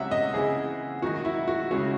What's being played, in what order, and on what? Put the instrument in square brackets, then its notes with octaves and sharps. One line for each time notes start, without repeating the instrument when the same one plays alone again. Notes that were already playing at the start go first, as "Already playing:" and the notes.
Already playing: [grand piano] C#2 C3 F#3 C#4 E4 [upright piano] E5 F#5
[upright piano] D#5
[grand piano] C#3 E3 C4 E4 [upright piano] G#4
[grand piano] F#2 D#3 G#3 D#4 [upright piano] F#4
[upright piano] E4
F#4
[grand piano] C#2 C#3 G#3 C#4 E4 [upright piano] F#4